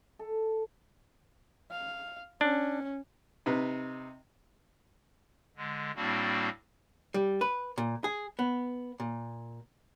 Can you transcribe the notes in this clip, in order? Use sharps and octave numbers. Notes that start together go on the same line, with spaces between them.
A4
F5
C#4 D4
C3 D#4 B4
D3 G#3
A2 G3 A#3 C4 D4 F#4
G3
B4
A#2
G#4
B3
A#2